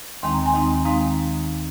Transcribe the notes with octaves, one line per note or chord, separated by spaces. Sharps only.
D#2 D#3 G#3 C4 D#4 C6
A#5
G#5 C6
D#2 D#3 G#3 C4 D#4
D#3 G#3 C4 D#4 F5 A#5